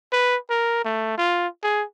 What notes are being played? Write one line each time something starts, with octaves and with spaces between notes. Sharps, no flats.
B4
A#4
A3
F4
G#4